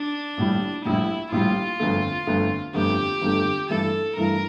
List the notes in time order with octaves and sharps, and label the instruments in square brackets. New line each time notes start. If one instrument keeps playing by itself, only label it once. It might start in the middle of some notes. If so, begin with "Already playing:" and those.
Already playing: [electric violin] D4
[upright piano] A#1 A2 G3
[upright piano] A#1 A2 G3 [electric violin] E4
[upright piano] A#1 A2 G3 [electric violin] F4
[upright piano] G1 F2 D3 A3
G1 F2 D3 A3
[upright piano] G1 F2 D3 A3 [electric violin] G4
[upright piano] G1 F2 D3 A3
[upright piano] G2 E3 A3 E4 [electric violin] A4
[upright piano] G2 E3 A3 E4 [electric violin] A#4